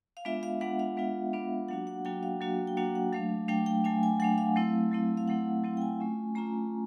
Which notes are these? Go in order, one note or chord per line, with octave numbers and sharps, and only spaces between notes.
F5
G#3 B3 D4 F4 E5
F5
G#3 B3 D4 F4 F#5
F5
G#3 B3 D4 F4
G#3 B3 D4 F4
F#3 A#3 D4 F#4 F#5
F#5
F#3 A#3 D4 F#4 G5
F5
F#3 A#3 D4 F#4
G5
F#3 A#3 D4 F#4 F#5
F#5
F#3 A3 D4 F5
F#3 A3 D4 G5
G5
F#3 A3 D4 G#5
G#5
F#3 A3 D4 F#5
F5
F#3 A3 C4 E4
F#3 A3 C4 E4
F5
F#3 A3 C4 E4 F#5
F#3 A3 C4 E4
G5
G#5
A3 C#4 F4
A3 C#4 F4 A#5